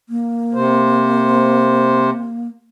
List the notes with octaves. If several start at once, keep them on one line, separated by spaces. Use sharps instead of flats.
A#3
C3 C5